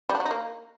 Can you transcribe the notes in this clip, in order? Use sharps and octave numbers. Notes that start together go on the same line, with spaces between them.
G3
D4
F#3
D#4
A#3